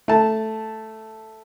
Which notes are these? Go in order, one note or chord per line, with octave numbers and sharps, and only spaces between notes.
A3 A5